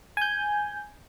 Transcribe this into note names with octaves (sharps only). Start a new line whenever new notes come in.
G#5 G6